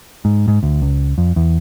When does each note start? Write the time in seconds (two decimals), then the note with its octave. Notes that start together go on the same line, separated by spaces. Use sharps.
0.25 G#2
0.48 G#2
0.63 D2
0.82 C#2
1.18 F2
1.36 E2